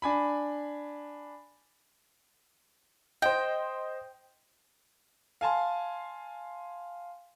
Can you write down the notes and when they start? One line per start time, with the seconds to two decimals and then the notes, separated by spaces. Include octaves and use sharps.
0.02 D4 G#5 B5
3.22 C5 D#5 G5
5.41 F5 G#5 A5 C6